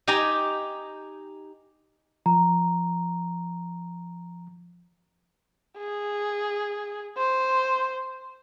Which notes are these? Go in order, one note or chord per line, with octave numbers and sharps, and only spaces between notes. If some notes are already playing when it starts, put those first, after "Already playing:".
D#4 G4 G5 G#5 A#5
F3 A#5
G#4
C5